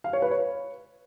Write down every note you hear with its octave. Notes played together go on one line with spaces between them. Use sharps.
F5
C#5
B4
C#5